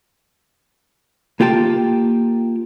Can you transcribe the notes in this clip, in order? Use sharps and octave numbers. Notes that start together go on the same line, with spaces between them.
A#3 F4 G4 G5 A5